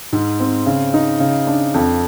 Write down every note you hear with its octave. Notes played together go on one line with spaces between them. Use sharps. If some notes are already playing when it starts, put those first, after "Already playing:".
G#2
C4
C#3
D#4
C#3
D4
F2